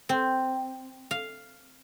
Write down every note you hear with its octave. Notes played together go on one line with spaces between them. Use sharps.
C4
F5